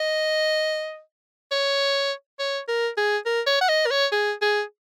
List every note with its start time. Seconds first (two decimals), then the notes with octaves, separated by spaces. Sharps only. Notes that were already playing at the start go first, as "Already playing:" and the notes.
Already playing: D#5
1.51 C#5
2.39 C#5
2.68 A#4
2.97 G#4
3.26 A#4
3.47 C#5
3.61 F#5
3.69 D#5
3.86 A#4
3.91 C#5
4.12 G#4
4.42 G#4